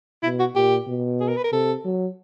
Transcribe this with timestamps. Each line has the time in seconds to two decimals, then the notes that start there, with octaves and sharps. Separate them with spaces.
0.23 B2 E4
0.40 F#4
0.55 A#2 G4
0.88 B2
1.21 G#4
1.29 A#4
1.37 B4
1.44 A#4
1.52 C3 A4
1.85 F#3